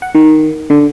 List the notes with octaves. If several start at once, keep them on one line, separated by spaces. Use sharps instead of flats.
F#5
D#3
D3